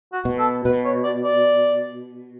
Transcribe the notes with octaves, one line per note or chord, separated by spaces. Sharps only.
F#4
B2
A4
B2 B4
C#5
D5
D5